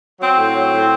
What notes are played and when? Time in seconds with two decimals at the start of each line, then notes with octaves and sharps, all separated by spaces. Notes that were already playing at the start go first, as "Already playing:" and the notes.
0.20 F#3 C4
0.37 A2
0.55 F#3
0.72 A2